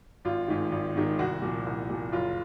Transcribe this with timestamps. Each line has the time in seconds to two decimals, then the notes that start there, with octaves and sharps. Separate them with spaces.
0.25 G#1 F4
0.48 G#2 D#3
0.72 G#1
0.95 G#2 D#3
1.19 C2 F#4
1.42 A#2 F3
1.66 C2
1.89 A#2 F3
2.12 F#1 F4